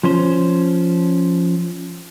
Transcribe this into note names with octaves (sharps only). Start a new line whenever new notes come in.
F3 C#4 C5